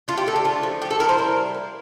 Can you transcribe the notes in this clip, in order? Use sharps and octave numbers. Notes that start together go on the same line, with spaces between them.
A3 F4
G4
D3 A4
G4
A3 F4
F3
A3 G4
A4
E4 A#4
C5
G3 A#4
E4
A#3